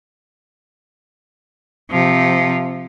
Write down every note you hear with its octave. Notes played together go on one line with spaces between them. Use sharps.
C3 F3